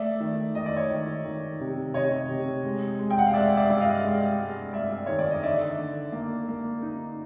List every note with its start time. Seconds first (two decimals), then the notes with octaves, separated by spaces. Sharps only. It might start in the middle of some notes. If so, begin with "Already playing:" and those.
Already playing: A3 D5 E5
0.20 D#3
0.55 D#3 D#5
0.66 D5
0.76 C#5 D#5
0.91 D#3
1.25 D#3
1.61 C3
1.94 C3 C#5 D#5
2.30 C3
2.64 G#3
2.99 G#3
3.10 G5
3.19 F#5
3.26 F5
3.34 G#3 D5 E5
3.57 D5 E5
3.70 G2
3.80 D#5 F5
4.04 G#3
4.39 G#3
4.73 G2 D5 E5
5.06 D#3 C#5
5.19 D5
5.31 D#5
5.43 D3 D5 E5
5.78 D3
6.12 A#3
6.48 A#3
6.82 D#4